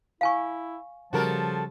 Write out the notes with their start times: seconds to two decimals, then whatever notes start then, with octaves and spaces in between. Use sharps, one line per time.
0.21 E4 F5 G#5 C#6
1.13 C#3 F3 G3 F#4 A4 A#4